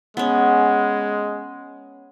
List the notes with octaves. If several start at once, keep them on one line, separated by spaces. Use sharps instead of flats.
G#3 B3 C#4